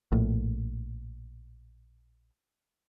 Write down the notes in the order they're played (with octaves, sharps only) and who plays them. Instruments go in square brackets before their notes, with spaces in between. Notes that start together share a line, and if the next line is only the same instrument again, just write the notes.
[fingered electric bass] A#1 A2